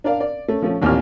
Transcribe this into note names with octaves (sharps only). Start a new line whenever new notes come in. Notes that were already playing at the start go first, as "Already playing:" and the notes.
D4 A#4 D5 F5
D5
A3 C#4
F3 A3 C#4
A1 D#2 A#2 C4 E4 F6